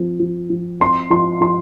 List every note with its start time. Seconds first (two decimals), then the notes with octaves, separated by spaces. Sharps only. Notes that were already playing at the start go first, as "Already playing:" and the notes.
Already playing: F3 C4
0.20 F3
0.50 F3
0.80 C4 C6
1.10 F3 C6
1.41 F3 C6